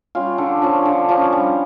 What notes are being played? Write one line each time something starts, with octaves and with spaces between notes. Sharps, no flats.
G3 C#4 F4
D3
F3 C#4
D3
F3 C#4
G3